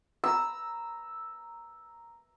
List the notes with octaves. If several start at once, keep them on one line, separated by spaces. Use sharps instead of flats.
A#5 E6